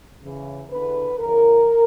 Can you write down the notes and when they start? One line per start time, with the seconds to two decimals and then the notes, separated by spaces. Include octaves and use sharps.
0.22 E2 C#3 E3
0.70 E2 D3 B4
1.20 E2 C#3 E3 A#4